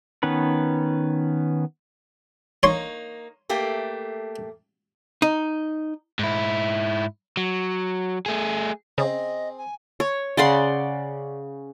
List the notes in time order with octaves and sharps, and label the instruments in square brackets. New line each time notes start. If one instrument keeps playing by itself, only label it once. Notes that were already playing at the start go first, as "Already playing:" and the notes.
[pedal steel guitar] D#3 B3 C#4 B4
[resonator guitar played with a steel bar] A#3 D#4 [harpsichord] C#5 C6
[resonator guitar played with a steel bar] A3 A#3 G4
[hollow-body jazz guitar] D#4
[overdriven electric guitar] G#2 E4
F#3
A3 G#4
[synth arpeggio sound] C#3 [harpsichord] C4 G#4 [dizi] D#5
[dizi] G#5
[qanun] C#5
C#3 D5 F#5 C6